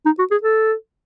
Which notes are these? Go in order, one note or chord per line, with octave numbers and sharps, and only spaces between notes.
D#4
F#4
G#4
A4